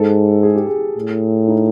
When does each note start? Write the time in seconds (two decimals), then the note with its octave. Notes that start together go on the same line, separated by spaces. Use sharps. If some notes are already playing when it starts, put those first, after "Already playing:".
Already playing: G#2 A4
0.43 G#4
0.55 G4
0.67 G#4
0.96 A2
1.48 D#4